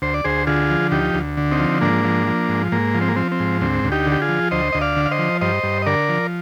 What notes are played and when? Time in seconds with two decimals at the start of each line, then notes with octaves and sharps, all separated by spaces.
0.02 D2 C5
0.14 D5
0.24 D2 G#4 C5
0.47 D3 F4 G#4
0.70 F3
0.92 D2 D#4 G4
1.14 D2
1.37 D3
1.51 C4 D#4
1.60 F3
1.81 G#2 A#3 D4
2.05 F3
2.27 F3
2.49 G#2
2.72 G#2 A#3
2.95 F3
3.01 C4
3.08 A#3
3.16 F3 C4
3.32 C4
3.39 G#2
3.61 D2 C4
3.84 D2
3.92 D#4 G4
4.07 D3 G4
4.21 F4 G#4
4.29 F3
4.51 D2 C5 D#5
4.72 D2 D#5
4.81 D5 F5
4.96 D3
5.05 F5
5.11 C5 D#5
5.19 F3
5.41 G2 C5 D#5
5.63 G2
5.82 D#5
5.86 D3 A#4 D5
6.09 F3